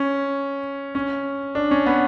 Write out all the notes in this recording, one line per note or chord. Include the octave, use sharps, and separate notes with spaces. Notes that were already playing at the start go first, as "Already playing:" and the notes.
Already playing: C#4
C#4
D4
C#4
B3